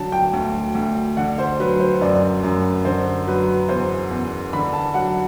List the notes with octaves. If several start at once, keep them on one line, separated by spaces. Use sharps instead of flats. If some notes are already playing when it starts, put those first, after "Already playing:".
Already playing: D3 F#3 A5
G5
D2
D2
D3 F#5
C5
F#3 B4
C5
F#2 D5
F#2
D3 C5
F#3 B4
E2 C5
E2
D3 B5
A5
F#3 F#5